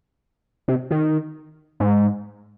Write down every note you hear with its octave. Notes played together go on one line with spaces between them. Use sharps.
C3
D#3
G#2